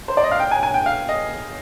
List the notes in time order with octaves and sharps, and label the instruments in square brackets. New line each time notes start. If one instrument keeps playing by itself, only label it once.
[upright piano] C5
D5
D#5
F5
G5
G#5
G#5
G5
F5
D#5